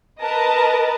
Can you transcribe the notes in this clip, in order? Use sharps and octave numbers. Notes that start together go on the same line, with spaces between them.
A#4 B4 D#5 A5